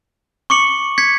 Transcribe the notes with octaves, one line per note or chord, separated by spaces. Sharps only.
C#6 D6 C#7 F#7
G#6 B6 C#7